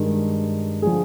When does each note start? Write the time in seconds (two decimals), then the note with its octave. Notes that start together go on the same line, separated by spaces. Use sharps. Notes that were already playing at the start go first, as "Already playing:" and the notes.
Already playing: G2 D#3 G#3
0.82 D3 F3 G#4